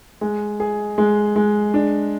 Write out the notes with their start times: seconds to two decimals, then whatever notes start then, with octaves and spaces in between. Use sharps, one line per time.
0.21 G#3
0.60 G#4
0.98 G#3
1.36 G#3
1.74 D4